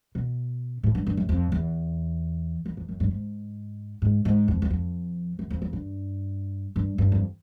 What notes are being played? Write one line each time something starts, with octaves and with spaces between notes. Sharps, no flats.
B2
A2
G2
G2
F#2
F2
E2
F2
F2
F#2
G2
G#2
G#2
G#2
F2
E2
F2
F#2
F2
F2
G2
G2
G2
F2